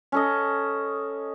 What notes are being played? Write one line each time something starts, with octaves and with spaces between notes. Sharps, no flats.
C#4 A4 D#5